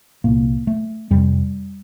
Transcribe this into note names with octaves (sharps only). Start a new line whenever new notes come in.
C2 A#2 A#3
A3
F2 C3 G3